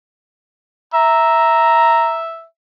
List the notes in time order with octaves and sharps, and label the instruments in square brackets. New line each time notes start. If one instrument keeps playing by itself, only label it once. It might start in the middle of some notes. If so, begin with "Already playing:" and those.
[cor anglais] E5 [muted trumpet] A#5